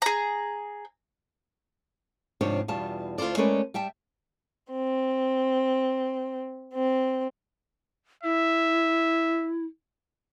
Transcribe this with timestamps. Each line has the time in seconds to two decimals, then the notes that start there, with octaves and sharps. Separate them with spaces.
0.02 G#4 A#5
2.41 G#2 C3 F3 D4 C#5
2.68 E2 B2 G3 F4 A5
3.18 D2 F4 A4 C5 D5
3.37 G#3 A3 C#4 A#4 B4 D5
3.74 G3 E5 G5 A5
4.71 C4
6.74 C4
8.23 E4 E5